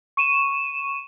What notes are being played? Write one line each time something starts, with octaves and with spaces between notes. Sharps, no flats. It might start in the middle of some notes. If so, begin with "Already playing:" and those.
C#6 D#7 E7